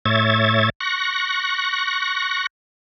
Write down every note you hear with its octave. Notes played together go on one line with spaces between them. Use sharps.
A2 C#5 E5 G#6 A6
C#6 F#6 A#6